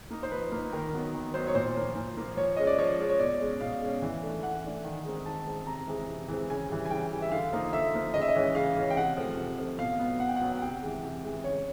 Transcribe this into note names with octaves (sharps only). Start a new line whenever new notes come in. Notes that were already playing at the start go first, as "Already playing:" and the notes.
A#3 D#4
C5
F3 B4
A#3 D#4
D#3 A#4
F#3 B3 D#4
D#3
F#3 B3 D#4 C5
C#5
A#2 C5
F3 A#3
A#2
F3 A#3
F3 C#5
G#3 C#4 D#5
D5
F3 C#5
G#3 C#4
C#5
B2 D5
G#3 C#4
B2 F5
G#3 C#4
E3
A3 D4
E3 F#5
A3 D4
D#3
G#3 C4 D#4
D#3 A5
G#3 C4 D#4
C3 A#5
E3 G#3 C4
C3
E3 G#3 C4
C#3 G#5
E3 G3
G#5
C#3 G5
E3 G3
E5
D3 F5
F3 A#3 D#4
D3 E5
F3 A#3 D#4
C#3 D#5
E5
D#5
E3 G#3 C#4
C#3 F5
E3 G#3 C#4
G5
C3 F#5
F3 A3
C3
F3 A3
B2 F5
F#3 B3
B2 F#5
G5
F#5
F#3 B3
F#5
C3 G5
E3 G#3
C3
E3 G#3
C#3 C#5